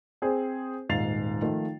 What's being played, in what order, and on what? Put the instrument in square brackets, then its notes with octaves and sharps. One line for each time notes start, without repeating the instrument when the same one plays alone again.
[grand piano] C4 G#4 C5
D#1 G#2 F5 A6 C7 F7
D#3 F3 A3 F4